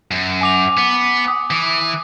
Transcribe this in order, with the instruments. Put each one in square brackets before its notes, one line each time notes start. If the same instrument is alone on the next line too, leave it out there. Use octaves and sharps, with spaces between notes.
[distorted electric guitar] F#2
[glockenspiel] G#5 D6 F7
[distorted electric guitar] B3
[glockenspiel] D#6
[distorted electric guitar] E3